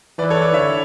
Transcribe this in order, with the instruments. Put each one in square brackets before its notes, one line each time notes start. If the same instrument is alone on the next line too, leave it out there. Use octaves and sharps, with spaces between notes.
[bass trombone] E3 [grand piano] B4 D5
[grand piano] A4 C#5
B4 D5
[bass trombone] D3 [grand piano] C#5 E5